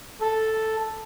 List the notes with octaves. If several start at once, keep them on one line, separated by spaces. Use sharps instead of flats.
A4